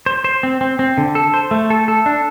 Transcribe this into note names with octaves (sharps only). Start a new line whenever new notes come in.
C5
C5
C4
C4
C4
D3
A4
C5
A3
A4
A4
D4